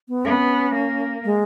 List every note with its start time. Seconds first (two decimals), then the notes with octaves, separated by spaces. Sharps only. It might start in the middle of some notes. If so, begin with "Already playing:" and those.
0.09 B3
0.25 B3 C#4
0.75 A#3
1.25 G#3